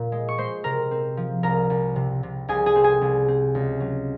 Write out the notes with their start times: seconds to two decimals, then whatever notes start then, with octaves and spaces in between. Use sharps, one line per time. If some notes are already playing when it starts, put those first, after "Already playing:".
Already playing: A#2
0.12 G#3
0.29 C#6
0.38 G#3 C5 C6
0.64 C3 A#4 A#5
0.91 C4
1.17 F3
1.43 C2 A#4 A#5
1.70 C2
1.96 C3
2.23 C3
2.48 C2 G#4 G#5
2.66 G#4 G#5
2.76 C4
2.84 G#4 G#5
3.01 C2
3.28 C4
3.55 C#2
3.80 F#3